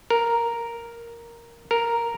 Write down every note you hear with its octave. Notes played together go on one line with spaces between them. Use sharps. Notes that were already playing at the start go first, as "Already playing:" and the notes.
A#4
A#4